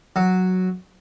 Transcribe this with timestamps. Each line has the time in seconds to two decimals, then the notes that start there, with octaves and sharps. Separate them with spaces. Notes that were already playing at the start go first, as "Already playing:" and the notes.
0.16 F#3